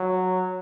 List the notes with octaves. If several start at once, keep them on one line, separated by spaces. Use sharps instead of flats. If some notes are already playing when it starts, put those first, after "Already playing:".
Already playing: F#3